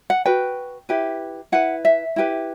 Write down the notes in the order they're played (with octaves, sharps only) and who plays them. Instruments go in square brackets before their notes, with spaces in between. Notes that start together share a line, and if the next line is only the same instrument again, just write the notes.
[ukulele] F#5
F#4 B4 G5
E4 G4 B4
E4 B4 F#5
E5
E4 G4 B4